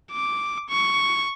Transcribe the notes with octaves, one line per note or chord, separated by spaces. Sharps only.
D6
C#6